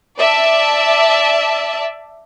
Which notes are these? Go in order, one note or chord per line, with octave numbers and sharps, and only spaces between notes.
D5 E5 A5